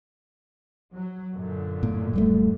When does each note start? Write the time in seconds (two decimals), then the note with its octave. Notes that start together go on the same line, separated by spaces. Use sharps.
0.94 F#3
1.34 F#2 A#2 D3
1.83 A2 A#3
2.13 D1 G3 A3